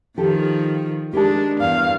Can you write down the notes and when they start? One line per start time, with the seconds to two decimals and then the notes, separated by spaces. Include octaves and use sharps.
0.18 D#3 F3 G4 A4
1.13 G#3 D4 G4 A#4 A5
1.60 E2 G2 F5